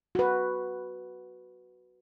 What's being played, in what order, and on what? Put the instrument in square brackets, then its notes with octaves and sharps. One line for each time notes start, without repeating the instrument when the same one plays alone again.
[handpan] F#4 B4